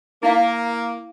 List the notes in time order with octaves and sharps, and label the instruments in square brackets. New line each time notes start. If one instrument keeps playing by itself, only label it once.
[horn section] A#3 [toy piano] E4 F5